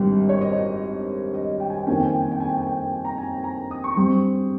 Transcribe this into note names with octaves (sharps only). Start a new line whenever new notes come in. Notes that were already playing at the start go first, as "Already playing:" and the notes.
Already playing: G#1 G2 G3
C#5
D#5
C#5
D#5
G5
G#5
G5
F2 D#3 A#3 C#4 G#5
G5
G#5
G5
G#5
G5
G#5
G5
G#5
G5
G#5
A#5
G#5
G#5
A#5
D#6
C#6
G2 G3 C4 C#6